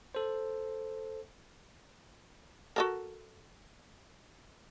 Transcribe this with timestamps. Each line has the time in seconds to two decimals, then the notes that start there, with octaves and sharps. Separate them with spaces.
0.15 A4 C5
2.76 F#4 A4 A#4